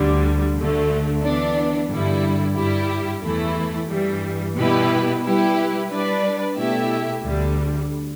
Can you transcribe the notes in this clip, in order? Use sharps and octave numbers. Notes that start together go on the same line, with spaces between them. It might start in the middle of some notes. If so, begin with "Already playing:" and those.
Already playing: D2 D3 G3
D2 D3 A3
E3 B3 D4
G2 D3 G3 E4
G2 G3 E4 G4
E2 E3 A3 E4
G2 E3 G3
B2 G3 E4 G4 B4
G3 E4 G4 B4
G3 D4 B4 D5
B2 A3 E4 G4 E5
D2 D3 G3